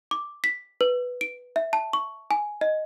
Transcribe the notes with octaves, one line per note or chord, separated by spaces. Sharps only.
D6
B6
B4
D7
E5
A5
C#6
G#5
D#5